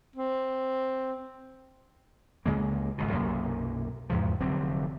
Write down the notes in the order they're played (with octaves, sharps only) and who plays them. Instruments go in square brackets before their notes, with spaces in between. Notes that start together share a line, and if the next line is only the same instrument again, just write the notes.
[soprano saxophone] C4
[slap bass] C#2 C#3 G#3 A#3
G1 C#2 B2
B1 F#2 C3 A#3
E2 G#2 C#3 F3
F1 D3 F#3 C4